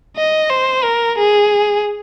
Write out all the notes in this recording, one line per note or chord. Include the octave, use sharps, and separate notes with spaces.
D#5
C5
A#4
G#4